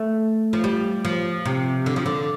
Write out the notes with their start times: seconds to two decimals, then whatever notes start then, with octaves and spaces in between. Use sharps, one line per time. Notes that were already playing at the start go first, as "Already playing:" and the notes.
Already playing: A3
0.53 F3
0.64 G3
1.05 F3
1.45 C3
1.86 D3
1.96 F3
2.06 D3